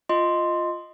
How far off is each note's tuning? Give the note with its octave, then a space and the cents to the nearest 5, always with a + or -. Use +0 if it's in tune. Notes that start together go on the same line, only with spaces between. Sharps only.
F4 +0 D#5 +0 C6 +0